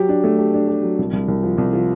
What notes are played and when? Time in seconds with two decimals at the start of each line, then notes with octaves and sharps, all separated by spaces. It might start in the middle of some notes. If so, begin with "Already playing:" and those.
Already playing: F#3 G4
0.09 D4
0.24 A3
0.38 G4
0.54 D4
0.68 G4
0.83 F#3
0.99 C2
1.13 C2
1.28 C2
1.43 F3
1.58 C2
1.73 F3